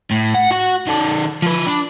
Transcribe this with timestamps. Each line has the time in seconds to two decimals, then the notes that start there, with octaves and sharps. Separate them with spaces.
0.11 A2
0.34 F#5
0.51 F#4 F#5
0.87 D#3 A4
1.42 F3 B4
1.66 D4